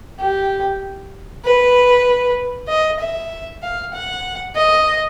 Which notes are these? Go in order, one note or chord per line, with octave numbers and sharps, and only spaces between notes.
G4
B4
D#5
E5
F5
F#5
D#5